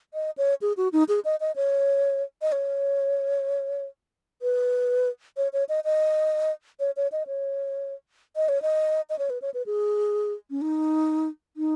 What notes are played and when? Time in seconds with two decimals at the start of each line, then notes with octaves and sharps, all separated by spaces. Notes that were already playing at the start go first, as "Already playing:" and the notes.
0.14 D#5
0.38 C#5
0.62 G#4
0.77 F#4
0.93 D#4
1.09 G#4
1.25 D#5
1.40 D#5
1.56 C#5
2.42 D#5
2.52 C#5
4.42 B4
5.37 C#5
5.53 C#5
5.69 D#5
5.85 D#5
6.80 C#5
6.97 C#5
7.12 D#5
7.27 C#5
8.36 D#5
8.49 C#5
8.62 D#5
9.10 D#5
9.19 C#5
9.30 B4
9.42 C#5
9.54 B4
9.66 G#4
10.50 C#4
10.61 D#4
11.57 D#4